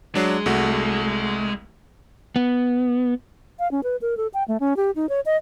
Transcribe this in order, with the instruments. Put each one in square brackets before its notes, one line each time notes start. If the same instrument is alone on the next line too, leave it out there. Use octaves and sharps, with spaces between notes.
[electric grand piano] F#3 D4 [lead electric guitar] G#3
[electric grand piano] C2 A3 F#4
[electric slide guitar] B3
[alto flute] F5
C#4
B4
A#4
A4
G5
A3
C#4
G4
D#4
C#5
D#5